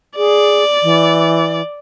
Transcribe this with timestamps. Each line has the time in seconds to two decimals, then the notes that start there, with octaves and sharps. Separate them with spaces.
0.17 G#4 D5
0.83 E3